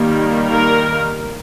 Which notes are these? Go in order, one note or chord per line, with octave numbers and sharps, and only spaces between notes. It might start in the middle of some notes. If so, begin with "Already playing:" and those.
Already playing: D#3 G3 A#3
A#4